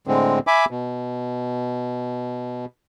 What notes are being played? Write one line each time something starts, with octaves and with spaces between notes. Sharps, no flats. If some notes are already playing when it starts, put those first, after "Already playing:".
A2 D3 G#3 C4
E5 G#5 B5 D6
B2